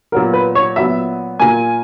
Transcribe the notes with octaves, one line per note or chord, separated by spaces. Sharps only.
A#2 F#3 B3 A#4
B4
C#5
A#2 F#3 B3 E5
A#2 A#3 G#5